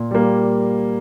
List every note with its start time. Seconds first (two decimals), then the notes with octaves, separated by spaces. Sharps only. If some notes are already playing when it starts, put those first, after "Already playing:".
Already playing: A#2
0.11 G3 A#3